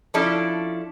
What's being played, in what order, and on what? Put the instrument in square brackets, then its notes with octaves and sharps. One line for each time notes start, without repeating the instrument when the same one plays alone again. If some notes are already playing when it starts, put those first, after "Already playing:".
[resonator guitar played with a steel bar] F3 C#4 D4 E4 A4